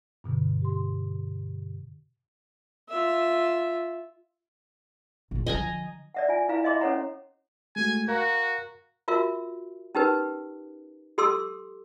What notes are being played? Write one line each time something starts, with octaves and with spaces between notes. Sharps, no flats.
G2 B2 D3
G4 C6
F4 E5
A#1 F3
D3 F3 D#5 G#5 A#5
D5 E5 F#5
F4 G#5
E4 F5 A#5
D#5 E5 C6 D6
C#4 A4 C#5 F#5 A#5
G#3 A3 F#4 G#5
F#4 A#4 F5 A#5
F4 F#4 A#4 E5
C#4 D#4 G4 A#4 B4
G4 A4 C6 D6 E6